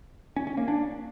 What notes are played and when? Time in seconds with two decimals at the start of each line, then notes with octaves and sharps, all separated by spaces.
0.36 C#4
0.47 C#4
0.57 A#3
0.68 D4